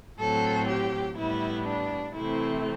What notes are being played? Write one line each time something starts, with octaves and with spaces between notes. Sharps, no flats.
A2 F#3 C4 A4
G4
A2 G3 B3 E4
D4
C3 E3 A3 C4 E4